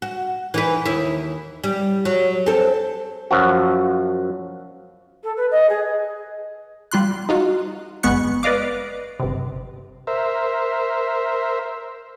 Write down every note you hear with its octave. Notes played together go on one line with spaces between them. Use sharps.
F#4
E3 D#4 B4
D#2 E4
G3
F#3
C4 A4
F#2 F3 F#4
A4
B4
D#5
G#4
G3 F4 C6 F#6
D#4 F4 F#4
G1 G#3 B3 C#6 F#6 C#7
B4 D5 D#5 F5 D6
G1 C3
A#4 C5 E5